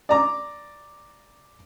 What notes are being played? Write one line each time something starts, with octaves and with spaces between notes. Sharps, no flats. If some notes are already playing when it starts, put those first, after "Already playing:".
D5 A#5 D6